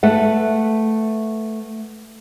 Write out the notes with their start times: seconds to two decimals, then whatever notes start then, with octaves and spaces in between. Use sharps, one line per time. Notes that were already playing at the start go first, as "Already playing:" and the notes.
0.03 A3 B4 F#5